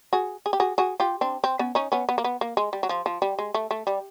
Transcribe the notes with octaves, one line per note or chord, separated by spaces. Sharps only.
F#4 G#4
G#4
G4
F#4 G#4
F#4 G#4
F4 G4
C4 D4
C4
B3 C#4
C#4 D#4
B3 C#4
B3
A#3
B3
A#3
G#3
G3
F#3
F3
F3
G3
G#3
A3
A3
G3